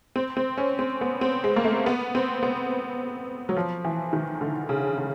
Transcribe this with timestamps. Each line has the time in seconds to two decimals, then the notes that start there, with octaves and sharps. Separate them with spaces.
0.16 C4
0.37 C4
0.58 C#4
0.79 C4
1.01 B3
1.21 C4
1.44 G#3
1.56 A#3
1.65 A3
1.86 B3
2.15 C4
2.43 B3
3.49 F#3
3.57 F3
3.84 E3
4.13 D#3
4.41 D3
4.69 C#3
4.98 C#3